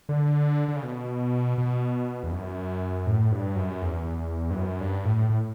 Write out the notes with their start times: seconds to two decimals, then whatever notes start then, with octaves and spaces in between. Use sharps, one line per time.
0.09 D3
0.68 D3
0.76 C#3
0.83 B2
1.58 B2
2.23 E2
2.32 F#2
3.06 A2
3.32 G2
3.56 F#2
3.82 E2
4.51 G2
4.56 F#2
4.80 G2
5.05 A2
5.30 A2